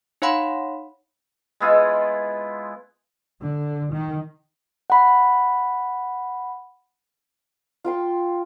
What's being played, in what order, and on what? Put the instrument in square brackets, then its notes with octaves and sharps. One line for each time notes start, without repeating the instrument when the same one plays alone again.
[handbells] D#4 C#5 F5 F#5 B5 C6
[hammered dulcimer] G#3 B3 E4 F4
[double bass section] D3
D#3
[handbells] F#5 B5
[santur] F4 G5 C6